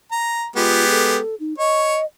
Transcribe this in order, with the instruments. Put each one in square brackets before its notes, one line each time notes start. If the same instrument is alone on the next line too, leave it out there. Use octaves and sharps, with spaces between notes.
[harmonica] A#5
[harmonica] G#3 B3 G4 [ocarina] F4
[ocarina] A4
D#4
[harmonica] C#5 [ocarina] D#5